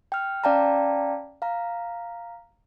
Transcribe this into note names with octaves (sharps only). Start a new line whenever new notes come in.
G5 F6
C#4 D5 F5 G5 A5 A#5
F5 A#5